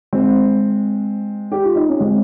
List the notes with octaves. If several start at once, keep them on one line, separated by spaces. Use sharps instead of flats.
G#3 C4
G4
F4
D#4
C#4
G#3 C4